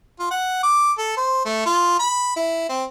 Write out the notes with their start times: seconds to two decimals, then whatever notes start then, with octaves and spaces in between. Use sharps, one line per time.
0.19 F4
0.31 F#5
0.63 D6
0.98 A4
1.16 C5
1.45 A3
1.66 F4
1.99 B5
2.36 E4
2.69 C4